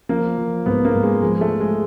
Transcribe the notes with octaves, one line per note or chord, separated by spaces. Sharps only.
F3 A#3
F3
G#2 B3
A#3
G#2
G#3
F3 G#3
A3
F3
G#3